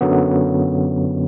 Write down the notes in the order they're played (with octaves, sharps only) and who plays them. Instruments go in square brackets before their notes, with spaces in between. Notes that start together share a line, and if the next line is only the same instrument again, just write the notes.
[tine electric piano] F#2 D3 F#3 B3